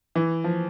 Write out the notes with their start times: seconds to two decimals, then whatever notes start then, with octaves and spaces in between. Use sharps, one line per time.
0.15 E3
0.44 F3